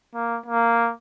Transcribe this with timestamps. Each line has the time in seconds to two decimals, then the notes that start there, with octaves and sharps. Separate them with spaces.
0.14 A#3
0.46 A#3